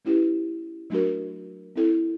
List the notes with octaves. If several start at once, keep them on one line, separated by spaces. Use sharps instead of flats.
A3 C#4 E4 G4 B4
F#3 A3 D4 F#4 A#4
C4 E4 A4